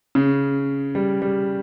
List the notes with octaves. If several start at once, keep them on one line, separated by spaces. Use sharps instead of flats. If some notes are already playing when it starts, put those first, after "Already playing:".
C#3
G3
G3